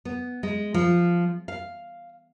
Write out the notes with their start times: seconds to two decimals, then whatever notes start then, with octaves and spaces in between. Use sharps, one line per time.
0.05 B3
0.43 G#3
0.74 F3
1.48 F5